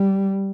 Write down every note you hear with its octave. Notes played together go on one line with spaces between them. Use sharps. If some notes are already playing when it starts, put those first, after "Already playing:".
Already playing: G3